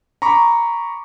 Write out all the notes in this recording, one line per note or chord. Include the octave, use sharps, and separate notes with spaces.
A#5 B5 C#6 D6